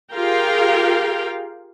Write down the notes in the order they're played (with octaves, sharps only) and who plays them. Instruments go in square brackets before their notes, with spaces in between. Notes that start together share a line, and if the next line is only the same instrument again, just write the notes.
[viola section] F4 G4 G#4 A#4 F5 G5